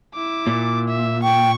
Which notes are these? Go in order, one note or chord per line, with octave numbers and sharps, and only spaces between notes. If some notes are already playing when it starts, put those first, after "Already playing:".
E4 D6
A#2
E5
G5 C#6